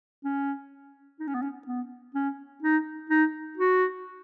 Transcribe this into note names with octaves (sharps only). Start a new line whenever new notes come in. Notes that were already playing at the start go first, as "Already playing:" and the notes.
C#4
D#4
C#4
B3
C#4
B3
C#4
D#4
D#4
F#4